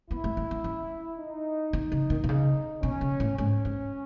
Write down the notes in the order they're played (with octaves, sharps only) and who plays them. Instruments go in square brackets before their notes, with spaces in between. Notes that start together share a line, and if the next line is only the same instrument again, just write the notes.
[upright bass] B3 [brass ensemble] E4
[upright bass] A3
A3
B3
C#4
[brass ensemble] D#4
[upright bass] D#3
C#3
D#3
B2
C#3
[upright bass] B2 [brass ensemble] C#4
[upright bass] C#3
A2
[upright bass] G#2 [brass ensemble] C#4
[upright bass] G#2